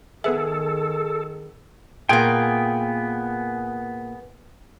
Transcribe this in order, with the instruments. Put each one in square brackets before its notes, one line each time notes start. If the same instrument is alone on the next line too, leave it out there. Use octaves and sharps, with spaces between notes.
[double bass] D#3 [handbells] B3 B4 E5 [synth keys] G#4 [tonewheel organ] A4
[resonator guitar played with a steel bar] A#2 A#3 [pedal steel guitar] B3 G#4 G5